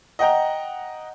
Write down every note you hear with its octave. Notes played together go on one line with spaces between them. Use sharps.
D#5 F#5 G5 A#5